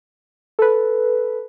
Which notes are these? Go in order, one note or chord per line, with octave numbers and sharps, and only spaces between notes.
A4 B4